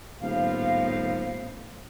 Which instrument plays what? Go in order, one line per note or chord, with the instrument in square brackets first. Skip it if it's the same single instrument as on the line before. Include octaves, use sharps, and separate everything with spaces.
[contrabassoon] D#1 [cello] A2 B3 [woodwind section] C5 F5